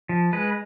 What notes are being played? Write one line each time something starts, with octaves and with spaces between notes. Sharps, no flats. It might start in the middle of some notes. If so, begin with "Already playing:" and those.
F3
G#3 B4